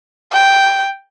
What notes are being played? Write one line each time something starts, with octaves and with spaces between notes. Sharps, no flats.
G5